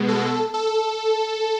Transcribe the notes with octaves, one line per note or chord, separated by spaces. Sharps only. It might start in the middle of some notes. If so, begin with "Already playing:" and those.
Already playing: B2 G#3 B3
A4
A4